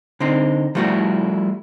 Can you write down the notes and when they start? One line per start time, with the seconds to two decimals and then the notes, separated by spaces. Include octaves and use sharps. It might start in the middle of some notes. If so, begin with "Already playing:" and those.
0.20 D3 C4 D#4
0.75 F3 G3 A3 E4 F#4